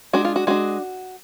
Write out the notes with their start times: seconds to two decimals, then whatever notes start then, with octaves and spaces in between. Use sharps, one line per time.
0.13 G#3 D4 F#4
0.25 F4
0.36 F#4
0.47 G#3 D4 F#4